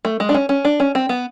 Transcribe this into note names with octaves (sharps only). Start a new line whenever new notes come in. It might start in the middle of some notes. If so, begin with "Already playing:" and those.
A3
G#3
D4
C#4
C#4
D4
C#4
C4
B3